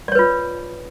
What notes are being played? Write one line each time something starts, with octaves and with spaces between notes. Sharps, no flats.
F4 B4 C#5 D5